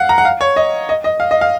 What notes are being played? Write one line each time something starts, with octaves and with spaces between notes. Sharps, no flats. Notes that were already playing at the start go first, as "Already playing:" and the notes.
Already playing: F5 F#5
A#5
F#5
F5
C#5
D#5
D#5
D#5
F5
D#5
F5